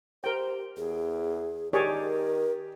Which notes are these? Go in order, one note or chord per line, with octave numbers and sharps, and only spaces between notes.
G4 A#4 C5 G5
E2 G#4
D#3 G4 G#4 A#4 C#5 D5